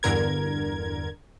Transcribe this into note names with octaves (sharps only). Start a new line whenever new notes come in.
E2 G2 D3 A#4 G#6